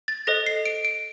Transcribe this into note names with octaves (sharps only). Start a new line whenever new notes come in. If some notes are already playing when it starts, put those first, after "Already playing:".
A6
A4 C5 D#5 A#6
C7
D7
D7